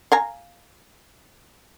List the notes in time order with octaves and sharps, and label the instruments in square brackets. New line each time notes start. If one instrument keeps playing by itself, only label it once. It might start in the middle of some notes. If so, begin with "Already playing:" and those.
[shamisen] F5 G#5 A#5